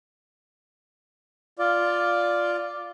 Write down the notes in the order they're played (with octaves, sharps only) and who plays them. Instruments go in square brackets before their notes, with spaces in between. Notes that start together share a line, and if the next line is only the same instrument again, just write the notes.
[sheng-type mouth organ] F4 D5